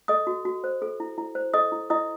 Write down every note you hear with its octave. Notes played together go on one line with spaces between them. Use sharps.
A4 D#5 D#6
F#4
F#4
C5
A4
E4
E4
C5
A4 D#5 D#6
E4
E4 D#5 D#6